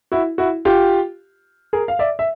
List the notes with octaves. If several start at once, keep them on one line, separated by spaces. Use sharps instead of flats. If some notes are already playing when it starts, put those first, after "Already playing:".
E4 F#4
E4 F#4
F4 G4
G#4 A#4
F5
D5 E5
E5